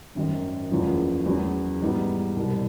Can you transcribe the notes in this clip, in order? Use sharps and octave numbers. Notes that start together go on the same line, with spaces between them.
G#1 F#2 D#3
F#1 E2 C#3 F3
E2 C#3 F#3
G#2 E3 G3 B3 D#4
C2 B2 G3